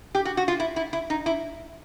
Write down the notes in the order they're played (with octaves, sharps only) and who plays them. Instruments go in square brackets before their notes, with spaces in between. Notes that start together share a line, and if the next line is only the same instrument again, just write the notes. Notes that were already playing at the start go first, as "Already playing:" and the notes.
[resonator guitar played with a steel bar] G4
F#4
F#4
F4
E4
E4
E4
D#4
E4